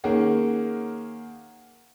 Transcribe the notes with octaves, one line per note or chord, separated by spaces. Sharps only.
D#3 A#3 C#4 G#4 F#5